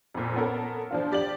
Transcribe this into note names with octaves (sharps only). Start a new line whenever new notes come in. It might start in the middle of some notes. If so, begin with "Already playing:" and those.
F2 A#2
B3 C#4 A4 A#4
F3 D4 F4
G4 D5 G5 F#7